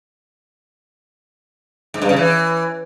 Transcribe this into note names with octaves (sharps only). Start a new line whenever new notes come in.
G#2
G2
C#3
E3